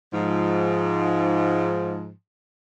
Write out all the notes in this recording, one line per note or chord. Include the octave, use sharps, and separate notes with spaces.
G#2 F3